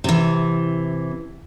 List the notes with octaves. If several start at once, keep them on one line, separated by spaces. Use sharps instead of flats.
C3 E3